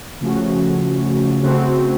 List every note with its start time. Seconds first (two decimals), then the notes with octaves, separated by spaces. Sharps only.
0.21 C#3 F3 A3 C#4 F#4
1.43 C#3 A3 C4 F#4